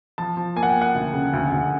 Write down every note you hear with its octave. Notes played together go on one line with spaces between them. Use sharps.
F3 A5
F3
A#3 G#5
F#5
G5
A#3
F#5
D2
C#3
D2
D2